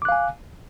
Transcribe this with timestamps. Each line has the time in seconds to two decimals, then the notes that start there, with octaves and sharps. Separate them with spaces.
0.02 D6
0.05 F#6
0.09 F5
0.12 G#5